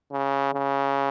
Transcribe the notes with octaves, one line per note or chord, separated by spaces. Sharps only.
C#3
C#3